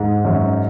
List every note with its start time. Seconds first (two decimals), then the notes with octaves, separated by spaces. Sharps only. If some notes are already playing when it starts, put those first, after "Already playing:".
Already playing: G#2
0.25 F#2